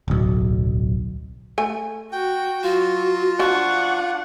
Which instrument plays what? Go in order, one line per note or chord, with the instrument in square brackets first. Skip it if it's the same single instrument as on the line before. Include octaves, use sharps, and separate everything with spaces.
[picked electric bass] D1 B1
[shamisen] A3 G#5
[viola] F#4 [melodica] G5
[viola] F#3 [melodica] F4 [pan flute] F#4
[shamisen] F3 F#4 [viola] D4 F#5 [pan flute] C#6